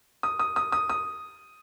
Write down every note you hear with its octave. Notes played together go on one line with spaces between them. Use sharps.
D#6
D#6
D#6
D#6
D#6